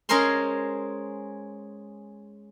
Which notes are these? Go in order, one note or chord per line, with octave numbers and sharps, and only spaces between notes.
G#3 C#4 G#4 A#4 C5 C6